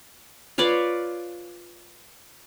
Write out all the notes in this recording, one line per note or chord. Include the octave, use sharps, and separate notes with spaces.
F4 B4 C#5 D5